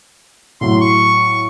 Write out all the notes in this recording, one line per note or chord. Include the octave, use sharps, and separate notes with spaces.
A2 F#3 C6
C#6